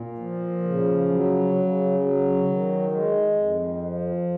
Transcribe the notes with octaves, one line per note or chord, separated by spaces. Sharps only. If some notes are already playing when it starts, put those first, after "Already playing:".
Already playing: A#2
F3
C#3
F#3
C#3
F#3
D#3
G#3
F2
F3